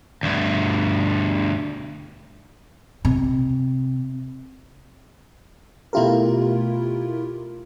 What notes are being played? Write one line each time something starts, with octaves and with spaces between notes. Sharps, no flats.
D2 G2
C3
B2 A3 E4 F4 G4 A#4